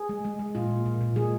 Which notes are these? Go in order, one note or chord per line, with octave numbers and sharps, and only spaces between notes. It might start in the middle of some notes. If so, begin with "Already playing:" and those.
Already playing: G#4
G#3
G#3
G#3
A#2 F4
A#2
A#2
A#2
G#3 G#4